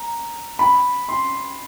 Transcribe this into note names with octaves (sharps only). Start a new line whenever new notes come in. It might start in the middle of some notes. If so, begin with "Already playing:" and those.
Already playing: A#5
B5
C6